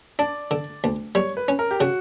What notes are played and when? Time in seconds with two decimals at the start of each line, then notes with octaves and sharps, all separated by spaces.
0.19 D4 D5
0.51 D3
0.84 D2
1.15 G3 C#5
1.37 B4
1.48 C#4
1.59 A#4
1.71 G4
1.80 C#3 F#4